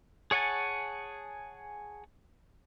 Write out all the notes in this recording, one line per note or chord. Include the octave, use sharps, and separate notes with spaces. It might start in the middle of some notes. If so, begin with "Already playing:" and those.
G#4 C#5 F#5 G#5 A5